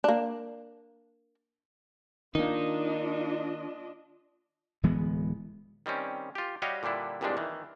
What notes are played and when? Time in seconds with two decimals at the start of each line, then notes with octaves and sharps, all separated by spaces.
0.04 A#3 D4
2.35 D#3 A#3 D4 D#4 F4 D#5
4.83 D1 E3 G#3 B3
5.86 D#3 G3 C4 C#4
6.35 F4 G4
6.62 G3 F#4 G4 C#5 D#5 F5
6.83 A#2 D3 G3 D4 E4
7.21 C2 G2 A#2 G3 G#3 D4
7.37 D#3 E3